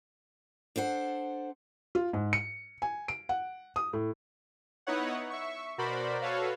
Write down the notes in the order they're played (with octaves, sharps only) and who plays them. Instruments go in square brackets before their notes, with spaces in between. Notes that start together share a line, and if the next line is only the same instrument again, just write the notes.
[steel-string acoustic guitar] D4 A4 C5 F#5
[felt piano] F4
G#2
C#7
G#5
D7
F#5
D#6
A2
[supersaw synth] B3 D#4 E4 B4 C#5 F#5
E5 C#6
B2 F#4 A#4 C5 D5 B5
F#4 A4 B4 C#5 F5